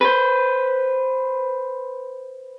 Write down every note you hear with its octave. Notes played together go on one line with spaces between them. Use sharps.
B4 C5